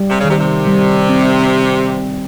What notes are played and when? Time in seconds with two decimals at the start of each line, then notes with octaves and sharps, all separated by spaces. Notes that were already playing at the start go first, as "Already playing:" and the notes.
Already playing: G3
0.10 C3
0.19 C#3
0.25 C3 D#3
0.38 C3
0.67 G3
1.09 C4